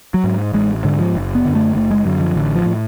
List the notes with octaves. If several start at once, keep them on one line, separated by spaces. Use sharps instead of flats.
F#3
G#2
A1 G#3
G#2 D3
F3
F#1
B3
F#2 D3
A3
F#1 A3
G#3
F#2 D3 F#3
F3
A1 D3
F3
A2